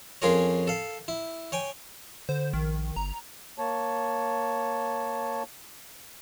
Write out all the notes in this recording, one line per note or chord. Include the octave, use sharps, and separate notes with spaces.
F2 C#4 F4 G#4 A#4 C#5
A4 F5
E4
C#5 G5 G#5
D3 C5
A#1 D#3
G1 A#5
A#3 C#5 A5